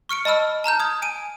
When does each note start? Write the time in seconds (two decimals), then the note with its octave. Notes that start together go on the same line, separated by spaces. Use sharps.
0.09 C#6 F6 C#7 D7
0.25 D#5 A5 B5 E6 F6
0.64 A5 A#5 F6 G6
0.80 D#6 G#6
1.02 G#5 D7 D#7